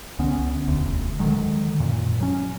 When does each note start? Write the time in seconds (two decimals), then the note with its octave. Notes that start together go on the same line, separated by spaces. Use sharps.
0.19 C#2 D3 B3 C#4
0.67 E1 D2
1.19 D3 D#3 F#3 G#3
1.80 F#2 A#2
2.21 F#3 C#4